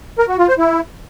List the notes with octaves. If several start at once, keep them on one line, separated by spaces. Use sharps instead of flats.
A#4
F#4
F4
C5
E4